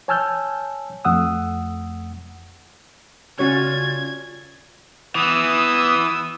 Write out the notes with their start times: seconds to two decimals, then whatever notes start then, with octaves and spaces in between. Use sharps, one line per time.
0.08 C#5 G#5 A5 E6 F6 G6
1.05 F2 A3 F#5 D#6 E6
3.39 C#3 G3 C#4 F4 F#4 C#5 G#6
5.15 E3 B3 D#6 E6